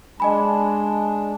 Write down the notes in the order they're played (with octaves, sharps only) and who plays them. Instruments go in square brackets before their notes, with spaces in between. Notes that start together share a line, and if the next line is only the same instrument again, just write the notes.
[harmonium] G#3 D4 [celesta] D#5 G#5 B5